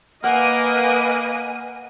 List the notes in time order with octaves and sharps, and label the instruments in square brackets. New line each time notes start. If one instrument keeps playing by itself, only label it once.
[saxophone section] A#3 [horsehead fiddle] B4 D#5 [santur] F#5 [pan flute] G#5